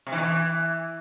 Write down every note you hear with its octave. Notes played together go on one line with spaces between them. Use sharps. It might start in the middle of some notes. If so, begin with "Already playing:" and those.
C3
E3
E2
E3